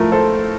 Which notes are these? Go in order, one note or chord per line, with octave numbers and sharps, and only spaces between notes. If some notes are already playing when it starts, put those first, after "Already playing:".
Already playing: A2 F3 A3 A#4
A4 C5